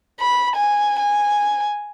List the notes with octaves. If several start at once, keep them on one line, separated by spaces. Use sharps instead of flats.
B5
G#5
G#5